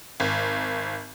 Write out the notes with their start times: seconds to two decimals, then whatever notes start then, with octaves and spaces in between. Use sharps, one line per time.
0.20 G#1